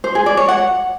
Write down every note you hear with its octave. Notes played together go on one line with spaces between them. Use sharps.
C5
G#4
D5
C#5
F#5